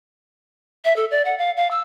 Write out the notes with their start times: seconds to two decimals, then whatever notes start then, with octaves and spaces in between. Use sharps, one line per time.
0.85 E5
0.96 A4
1.11 D5
1.25 F#5
1.38 F5
1.57 F5
1.71 E6